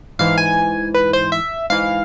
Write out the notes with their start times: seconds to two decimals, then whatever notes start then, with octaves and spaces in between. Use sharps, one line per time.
0.19 G#2 E3 F5
0.38 G#5
0.94 B4
1.13 C5
1.32 E5
1.70 G#2 E3 F5